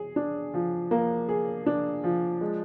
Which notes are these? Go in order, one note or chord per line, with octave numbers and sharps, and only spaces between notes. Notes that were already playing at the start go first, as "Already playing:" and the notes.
Already playing: G#4
D4
F3
A#3
G#4
D4
F3
G#3